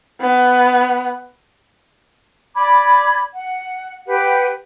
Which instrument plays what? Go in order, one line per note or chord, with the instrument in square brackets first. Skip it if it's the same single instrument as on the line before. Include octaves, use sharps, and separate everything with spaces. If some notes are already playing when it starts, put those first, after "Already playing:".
[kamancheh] B3
[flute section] D5 B5 D6 G#6
F#5
G4 B4 F#5